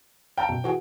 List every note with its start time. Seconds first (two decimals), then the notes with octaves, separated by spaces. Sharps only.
0.38 F5 G5 A5 A#5
0.49 F#2 B2
0.64 E3 F#4 G#4